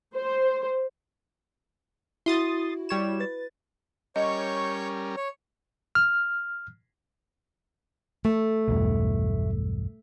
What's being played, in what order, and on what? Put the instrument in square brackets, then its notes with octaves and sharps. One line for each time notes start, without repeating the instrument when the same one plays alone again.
[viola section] C5
[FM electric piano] E4 F#4 [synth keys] C6 D#6 A6
[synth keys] G3 C#5 E7
[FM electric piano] B4 A6
[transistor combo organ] G3 C#4 A#4 [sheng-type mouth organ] C#5 C#6 G6 [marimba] D#5
[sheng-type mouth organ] C#5
[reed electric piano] F6
[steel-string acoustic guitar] A3
[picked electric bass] B1 E2 G2